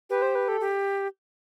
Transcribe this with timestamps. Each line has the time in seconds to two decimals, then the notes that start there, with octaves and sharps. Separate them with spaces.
0.10 G4 B4
0.22 C5
0.35 B4
0.48 A4
0.61 G4